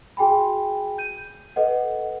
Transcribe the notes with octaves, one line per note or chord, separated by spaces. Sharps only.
F#4 G#4 G5 G#5 B5
G6 D#7
A4 B4 D#5 F#5